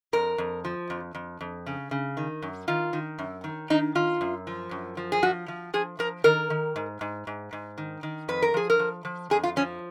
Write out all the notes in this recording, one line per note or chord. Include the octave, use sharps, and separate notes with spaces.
F2 A#4
F2
F3
F2
F2
F2
C#3
C#3
D#3
F#2
D#3 F4
D#3
F#2
D#3
D#3 D#4
D#3 F4
F#2
F3
F#2
F3
G#4
F3 F#4
F3
F3 G#4
F3 A#4
D#3 A#4
D#3
G#2
G#2
G#2
G#2
D#3
D#3
F2 B4
A#4
F3 G#4
A#4
F3
F3
F2 G#4
F4
F3 C#4